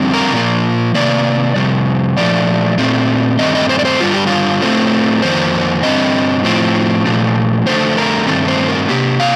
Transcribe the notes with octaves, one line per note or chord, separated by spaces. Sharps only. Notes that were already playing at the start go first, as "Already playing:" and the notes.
Already playing: F2 D3 G3 C4
A#4
A#2 F3 A#3
C3 D#3 A#3 D5
F2 C3 G3
A#2 F3 A3 D5
A#2 A3 C4
G2 D#3 A3 C4 D#5
D#5
C5
D5
C5
G2 D3 G3 F4
G4
F4
A2 A3 C4
F2 D#3 A#3 C5
G2 D3 F3 C4 D#5
A2 F3 C4
A#2 F3 A3
F2 D3 A3 C5
A#4
G2 D#3 A3 C4 A4
C5
A#4
C3 D#3 A#3 G4
F5